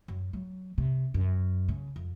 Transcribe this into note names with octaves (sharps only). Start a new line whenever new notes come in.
F#2
F#3
C3
F#2
C#3
F2